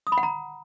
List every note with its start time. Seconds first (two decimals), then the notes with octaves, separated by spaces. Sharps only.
0.07 D#6
0.12 B5
0.18 F#5
0.23 A#5